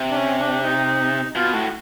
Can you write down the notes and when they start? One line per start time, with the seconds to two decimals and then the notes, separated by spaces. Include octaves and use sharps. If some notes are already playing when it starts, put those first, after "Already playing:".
Already playing: C3
0.10 D4
0.14 C#4
0.39 D4
0.63 D#4
1.36 B2 F4
1.53 A2 F#4